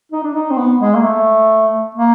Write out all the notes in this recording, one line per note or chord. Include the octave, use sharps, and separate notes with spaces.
D#4
D4
D#4
C4
B3
G#3
A#3
A3
A#3